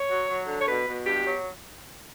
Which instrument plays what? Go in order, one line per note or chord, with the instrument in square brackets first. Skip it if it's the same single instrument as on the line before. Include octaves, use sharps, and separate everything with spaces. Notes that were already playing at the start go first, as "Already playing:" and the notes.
Already playing: [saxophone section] C#5
F#3
F#3
D3
C#5
B2 B4
B2
G2 G4
F#3